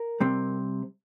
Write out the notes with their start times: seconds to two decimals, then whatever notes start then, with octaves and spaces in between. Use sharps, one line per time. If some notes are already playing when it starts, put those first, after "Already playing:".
Already playing: A#4
0.20 C3 G3 C4